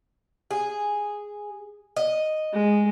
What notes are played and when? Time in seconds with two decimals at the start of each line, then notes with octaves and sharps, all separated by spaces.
0.51 G#4
1.96 D#5
2.53 G#3